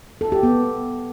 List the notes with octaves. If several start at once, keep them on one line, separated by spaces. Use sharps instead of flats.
A4
G4
B3